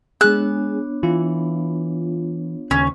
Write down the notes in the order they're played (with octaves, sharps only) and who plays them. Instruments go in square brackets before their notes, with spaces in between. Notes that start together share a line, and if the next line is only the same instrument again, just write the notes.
[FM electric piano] G#3 G#4 [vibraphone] B3 D4 C#5 [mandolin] F#6
[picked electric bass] E3 [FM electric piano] F4
[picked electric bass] D#2 C#3 [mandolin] C#4